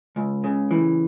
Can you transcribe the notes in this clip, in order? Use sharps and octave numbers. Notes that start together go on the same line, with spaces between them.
C#2
C#3
E3